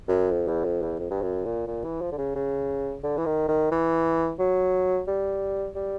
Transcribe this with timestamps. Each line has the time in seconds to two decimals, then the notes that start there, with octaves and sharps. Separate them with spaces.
0.08 F#2
0.31 F2
0.48 E2
0.65 F2
0.82 E2
0.99 F2
1.11 G2
1.22 F#2
1.45 A#2
1.67 A#2
1.84 E3
2.01 F3
2.12 D3
2.18 C#3
2.36 C#3
3.04 D3
3.18 E3
3.26 D#3
3.49 D#3
3.72 E3
4.40 F#3
5.08 G3
5.75 G3